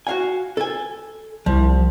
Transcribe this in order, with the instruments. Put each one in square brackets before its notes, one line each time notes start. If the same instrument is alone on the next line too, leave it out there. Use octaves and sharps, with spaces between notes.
[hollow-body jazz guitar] F#4 F5 G#5
A4 G#5
[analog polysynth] C2 [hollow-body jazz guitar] F3